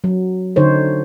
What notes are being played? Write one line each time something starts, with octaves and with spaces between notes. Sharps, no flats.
F#3
D3 D#4 C5 C#5